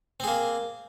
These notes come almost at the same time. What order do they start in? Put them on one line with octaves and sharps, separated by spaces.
C4 G#4 A#3